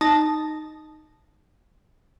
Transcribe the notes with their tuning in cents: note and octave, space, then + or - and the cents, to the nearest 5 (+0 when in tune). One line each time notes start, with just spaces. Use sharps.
D#4 -5 A5 -5